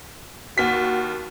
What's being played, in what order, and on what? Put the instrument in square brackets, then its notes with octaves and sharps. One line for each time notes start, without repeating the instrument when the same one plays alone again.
[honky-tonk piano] D#2 B6 [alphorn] F#4